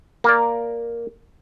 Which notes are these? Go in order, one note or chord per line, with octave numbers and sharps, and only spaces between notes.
A#3 A#4 D5